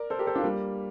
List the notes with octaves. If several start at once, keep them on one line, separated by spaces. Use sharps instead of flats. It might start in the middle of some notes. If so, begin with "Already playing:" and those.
Already playing: A#4 D5
A4 C5
G4 A#4
A4 C5
D4 F4
G3 A#3